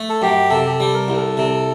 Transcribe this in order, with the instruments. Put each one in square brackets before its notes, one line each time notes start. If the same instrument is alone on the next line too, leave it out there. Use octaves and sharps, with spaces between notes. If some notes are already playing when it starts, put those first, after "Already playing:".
Already playing: [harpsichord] A3
[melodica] A4
[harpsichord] F#2 [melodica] G4
[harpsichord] C3 [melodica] A4
[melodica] G4
A4
[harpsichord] G3
[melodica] A#4
[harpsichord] C2
[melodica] A4
[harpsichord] C3